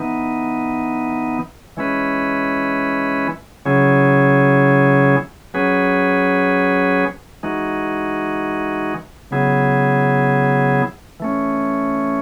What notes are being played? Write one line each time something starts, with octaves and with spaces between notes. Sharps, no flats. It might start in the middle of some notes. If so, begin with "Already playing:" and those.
Already playing: E3 B3 D#4
E3 G#3 C#4 E4 B4
C#3 F#3 C#4 E4 G#4
F#3 C#4 G#4 B4
E3 G#3 D#4 F#4
C#3 F#3 B3 E4 G#4
E3 A3 C#4